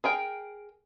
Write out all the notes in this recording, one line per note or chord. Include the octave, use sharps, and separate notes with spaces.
G#4 A#4 G5